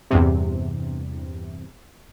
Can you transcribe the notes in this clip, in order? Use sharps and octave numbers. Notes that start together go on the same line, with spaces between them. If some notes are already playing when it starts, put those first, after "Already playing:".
E2 G2 C3